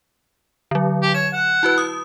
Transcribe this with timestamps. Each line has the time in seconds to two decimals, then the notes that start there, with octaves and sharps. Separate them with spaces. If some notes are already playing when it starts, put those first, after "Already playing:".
0.71 D3 F#3
1.02 G4
1.14 C#5 E7
1.33 F#5
1.63 E4 F#4 B4
1.78 D#6